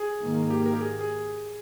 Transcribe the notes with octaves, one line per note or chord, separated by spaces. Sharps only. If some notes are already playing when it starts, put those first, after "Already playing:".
Already playing: G#4
G#2 D#3 A#3
G4
A#4
G4
G#4
G#4